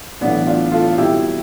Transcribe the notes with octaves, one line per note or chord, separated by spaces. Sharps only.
B1 A2 E3 B3 D4
D4 F4
F4 A4
C2 B2 E4 G4